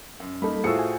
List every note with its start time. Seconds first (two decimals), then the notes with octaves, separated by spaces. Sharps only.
0.20 F#2
0.42 G3 A#3 D#4 A4 B5
0.64 A2 A3 F4 F#4 G#4 C5 E6 C#7
0.79 G#5